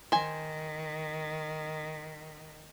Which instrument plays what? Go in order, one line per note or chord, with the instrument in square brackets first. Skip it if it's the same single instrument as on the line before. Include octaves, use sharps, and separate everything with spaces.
[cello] D#3 [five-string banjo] C5 G#5